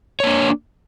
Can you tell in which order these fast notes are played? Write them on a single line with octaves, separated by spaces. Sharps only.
C#5 A#3 D4